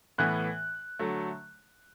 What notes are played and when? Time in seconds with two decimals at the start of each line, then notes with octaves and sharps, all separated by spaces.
0.18 A2 E3 B3 F#6
0.99 D3 F#3 A3